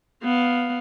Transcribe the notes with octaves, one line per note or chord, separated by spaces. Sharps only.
B3 F5